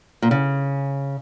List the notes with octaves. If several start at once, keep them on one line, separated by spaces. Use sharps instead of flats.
A#2
C#3